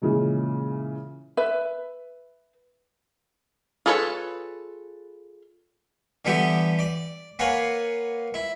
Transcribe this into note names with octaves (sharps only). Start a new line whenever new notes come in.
A#2 C#3 E3 G#3
B4 E5
F4 G#4 A4 B4 C#5
D3 E3 G3 B3 E4 G4
D5
A#3 B4 C#5 F#5 G#5
E4